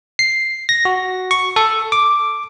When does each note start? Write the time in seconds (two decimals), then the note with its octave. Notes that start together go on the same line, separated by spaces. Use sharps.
0.19 C7
0.69 A#6
0.85 F#4
1.31 C#6
1.56 A4
1.92 D6